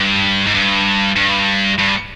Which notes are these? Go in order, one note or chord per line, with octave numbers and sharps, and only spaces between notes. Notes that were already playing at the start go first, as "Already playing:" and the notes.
Already playing: G2
G#2
G2
G2
G2